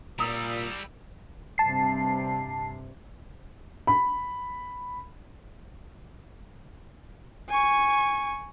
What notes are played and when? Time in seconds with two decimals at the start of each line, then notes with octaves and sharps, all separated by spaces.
0.19 A#2 G3 E4 A#5 D#6 E6
1.58 G2 C3 A5 C7
3.87 B5
7.49 G#5 C#6